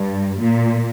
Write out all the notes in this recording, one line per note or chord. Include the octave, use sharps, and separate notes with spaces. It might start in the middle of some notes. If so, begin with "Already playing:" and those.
Already playing: G2
A#2